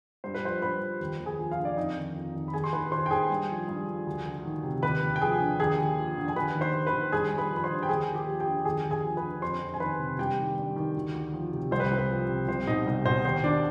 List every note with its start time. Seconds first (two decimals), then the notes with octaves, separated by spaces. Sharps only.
0.24 G2 C5
0.34 B4
0.43 F3 C5
0.62 G2 B4 B5
0.82 F3
1.01 D#2
1.20 D#2
1.26 G#4 G#5
1.39 F3
1.51 F4 F5
1.57 D3
1.65 D5
1.77 F2 D#4 D#5
1.96 D#3
2.15 F2
2.34 D#3
2.48 B5
2.53 D#2 G#4 G#5
2.64 C6
2.72 D#3 B4 B5
2.91 D#2 C5 C6
3.06 G5
3.10 D#3 G#4 G#5
3.30 G2
3.50 F3
3.68 G2
3.87 F3
4.07 D2
4.25 D2
4.45 D#3
4.64 C3
4.83 D#2 B4 B5
5.03 D#2
5.16 G5
5.22 F3 G#4 G#5
5.40 D3
5.59 D#2 G#4 G#5
5.78 D#2
5.98 F3
6.18 D3
6.28 G#5
6.36 D#2 B4 B5
6.55 D#3
6.61 C5 C6
6.74 D#2
6.87 B4 B5
6.93 D#3
7.12 G2 G#4 G#5
7.31 G2
7.38 B4 B5
7.51 F3
7.57 B5
7.64 C5 C6
7.70 D3
7.83 G5
7.89 D#2 G#4 G#5
8.08 D#2
8.15 G4 G5
8.27 F3
8.40 G4 G5
8.47 D3
8.65 D#2 G#4 G#5
8.85 D#2
8.91 G#4 G#5
9.04 F3
9.17 B4 B5
9.23 D3
9.42 F2 C5 C6
9.61 F2
9.74 G#5
9.80 D#3 B4 B5
9.99 C3
10.19 G2 G4 G5
10.38 D#3
10.57 G2
10.76 D#3
10.95 D2
11.14 D2
11.34 F3
11.52 C3
11.71 C2 C5
11.80 B4
11.91 C2
11.98 B4
12.10 F3
12.28 C3
12.48 C2 C5
12.67 B2 D#4 D#5
12.86 C2
13.06 B2 C5
13.25 D#2 C5
13.44 D#2 D4 D5